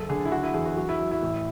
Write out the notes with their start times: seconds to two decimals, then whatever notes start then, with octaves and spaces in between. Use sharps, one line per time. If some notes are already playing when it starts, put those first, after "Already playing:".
Already playing: F#1 A4
0.09 D3 G#4
0.25 E4
0.32 F#3 F#4
0.43 E4
0.54 E2 G#4
0.65 F#4
0.76 F#3 F#4
0.89 E4
0.99 F#3
1.11 E4
1.23 A1